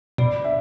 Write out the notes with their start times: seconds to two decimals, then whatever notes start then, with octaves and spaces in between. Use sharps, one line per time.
0.18 B2 D5
0.44 E5